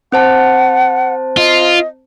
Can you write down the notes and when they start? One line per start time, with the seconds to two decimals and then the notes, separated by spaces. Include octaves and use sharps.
0.12 C4 C5 F#5 A5
1.37 F4 D#5